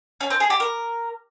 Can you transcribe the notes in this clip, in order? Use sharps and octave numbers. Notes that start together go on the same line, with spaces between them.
C#4
C4
G#4
G4
A#4